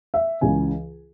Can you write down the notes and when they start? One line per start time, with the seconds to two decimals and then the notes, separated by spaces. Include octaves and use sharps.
0.14 E5
0.41 C#2 C#3 E3 G#5